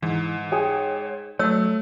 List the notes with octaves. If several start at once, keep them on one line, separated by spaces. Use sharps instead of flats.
G#2 E3
G#4 C#5 G5
F#3 A3 C#5 E6